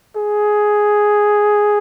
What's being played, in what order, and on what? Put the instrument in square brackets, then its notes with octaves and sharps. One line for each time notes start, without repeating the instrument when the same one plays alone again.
[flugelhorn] G#4